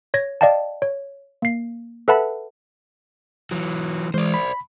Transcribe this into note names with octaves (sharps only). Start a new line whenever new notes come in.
C#5 G#6 A#6
D5 D#5 F5 G5 A5
C#5
A#3 C7
A4 B4 E5 F#5 A5 B5
E3 F#3
E3 G#3 C5 D5
B5